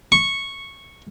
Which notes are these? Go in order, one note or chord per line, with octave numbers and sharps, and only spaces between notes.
C#6